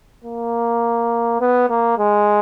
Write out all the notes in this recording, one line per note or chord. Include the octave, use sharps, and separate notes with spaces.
A#3
B3
A#3
G#3